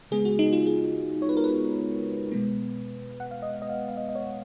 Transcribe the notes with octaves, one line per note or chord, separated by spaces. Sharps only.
C#3 G#3 B3 G#4
F#4
D#4
F4
G#4
C#5
B4
A#4
B4
B2 G#3 B3
F#5
F5
D#5
D#5
F5
F5
D#5
D#5
C#5